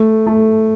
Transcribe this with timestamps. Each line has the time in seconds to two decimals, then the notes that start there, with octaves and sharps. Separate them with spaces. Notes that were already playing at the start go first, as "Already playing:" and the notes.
Already playing: A3
0.26 A3